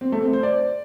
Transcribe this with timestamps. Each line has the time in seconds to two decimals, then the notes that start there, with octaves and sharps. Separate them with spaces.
0.01 C4
0.12 A3
0.23 C4
0.33 C5
0.43 D5